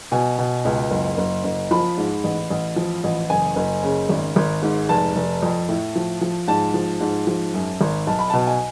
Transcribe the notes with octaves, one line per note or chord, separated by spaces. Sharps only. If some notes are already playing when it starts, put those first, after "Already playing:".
B2 G#5
B2
C#2
F#1
F#1
F#1
F3 B5
G#2
A1
A1
F3
A1
F#1 G#5
F#1
C#3
G#1
G#1
G#2
F1 A5
F1
F2
A2
F3
F3
G#2 A5
F3
G#2
F3
F#2
G#1
B1 A5
B5
B2 A5
G#5